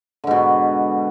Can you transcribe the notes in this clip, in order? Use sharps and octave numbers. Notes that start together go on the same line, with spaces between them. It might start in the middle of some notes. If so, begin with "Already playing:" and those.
G#2 B2 D3